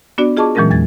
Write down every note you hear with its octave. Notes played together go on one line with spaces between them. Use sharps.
B3 D4 F#4 D5
F4 G#4 D#5 A5 C#6 D6
A#2 E3 F#3 G#3 C#4 A#4
E2 G#3 G#6 A6